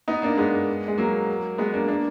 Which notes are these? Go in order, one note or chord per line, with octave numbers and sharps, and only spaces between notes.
B3 D#4
A#3 D4
G#3 B3
G#3
F#3 A#3
G#3 B3
A#3 D4
A#3 D4